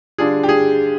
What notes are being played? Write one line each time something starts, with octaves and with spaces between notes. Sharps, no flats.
D3 G3 D4 F4 G#4
G4
G#4